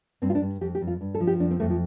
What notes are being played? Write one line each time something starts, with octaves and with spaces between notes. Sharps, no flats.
G2 C4
F4
D4
G2
F2 G4
G4
F2
F4
G2
A4
F3
G4
F2 D4
C4
F2 A3
F3